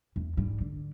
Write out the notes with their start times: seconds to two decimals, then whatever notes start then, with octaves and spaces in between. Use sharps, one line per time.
0.16 E2
0.37 G#2 G3
0.61 D3